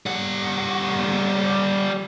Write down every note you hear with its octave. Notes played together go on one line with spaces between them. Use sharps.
G3 F#5